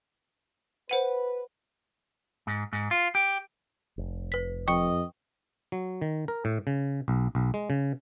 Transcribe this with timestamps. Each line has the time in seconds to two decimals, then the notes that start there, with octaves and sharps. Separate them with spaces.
0.89 B4 C5 F#5 D#7
2.47 G#2
2.73 G#2
2.91 F4
3.15 G4
3.98 F1
4.32 B4 B6
4.68 F2 D#5 G5 C#6 C#7
5.72 F#3
6.02 D#3
6.28 A#4
6.45 A2
6.67 C#3
7.08 B1
7.35 B1
7.54 G#3
7.70 C#3